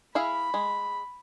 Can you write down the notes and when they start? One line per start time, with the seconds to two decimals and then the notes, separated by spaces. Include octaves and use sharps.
0.15 E4 G#4 F5 B5
0.54 G#3